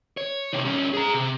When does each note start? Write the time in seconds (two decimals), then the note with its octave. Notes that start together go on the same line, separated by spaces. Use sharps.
0.17 C#5
0.53 C3 D#3
0.65 G2 C#4
0.94 G#4 A#5
1.14 C3